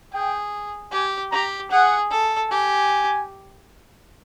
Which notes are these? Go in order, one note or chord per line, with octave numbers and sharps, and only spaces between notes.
G#4 G5
G4 G#5
G4 A#5
G#4 F#5
A4
G4 G#5